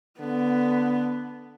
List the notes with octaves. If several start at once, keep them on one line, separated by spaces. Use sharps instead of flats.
D3 B3